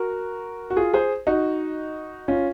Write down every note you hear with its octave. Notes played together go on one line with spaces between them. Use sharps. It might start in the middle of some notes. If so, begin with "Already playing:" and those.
Already playing: F#4 A#4
F#4
F4 G#4
G#4 C5
D#4 F#4
C#4 F4